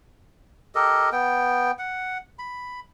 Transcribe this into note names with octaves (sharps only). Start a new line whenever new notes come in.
G4 A4 A#4 D#5
B3 G5
F#5
B5